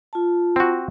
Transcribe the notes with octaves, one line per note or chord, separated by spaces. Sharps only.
F4 A5
C4 F#4